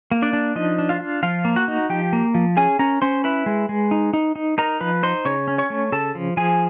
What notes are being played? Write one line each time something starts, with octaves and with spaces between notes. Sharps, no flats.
A#3
D4 D5
D4
F3 D#4 D#5
D4
F4 F5
F4
F3 F4 F5
A#3
F#4 F#5
D#4
F3 G4 G5
A#3
F3
C#4 G#4 G#5
C#4 A#4 A#5
C#4 C5 C6
E4 B4 B5
G#3
G#3
D#4
D#4
D#4
D#4 A#4 A#5
F3 B4 B5
D#4 C5 C6
C#3 C#5 C#6
C#4
C#5 C#6
A3
C#3 A4 A5
F3
F3 G#4 G#5